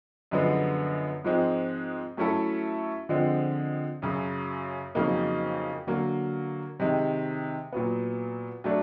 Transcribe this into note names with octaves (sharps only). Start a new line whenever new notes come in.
F#2 D3 F3 G#3 B3
G#2 F3 G#3 C4
F#3 A3 C#4 E4 A4
D3 F3 G#3 C4
F#2 C#3 F#3
F2 C#3 F#3 A#3 D#4
D3 F#3 A#3
C3 D#3 G#3
A#2 F#3 B3
F#3 A3 D4